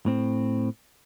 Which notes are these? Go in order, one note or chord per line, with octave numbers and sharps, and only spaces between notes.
A2 C4